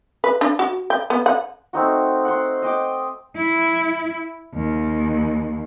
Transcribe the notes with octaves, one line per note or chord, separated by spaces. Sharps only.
B4
D4
F#4
G5
B3
F#5
A3 C4 D#4 F#4
F#5 C6
D#5 G5 D6
E4
D#2